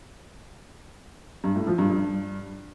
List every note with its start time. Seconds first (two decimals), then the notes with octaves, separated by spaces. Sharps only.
1.44 G2
1.55 A2
1.67 F3
1.78 G2
1.90 G2